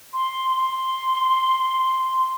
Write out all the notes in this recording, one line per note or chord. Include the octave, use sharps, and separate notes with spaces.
C6
C6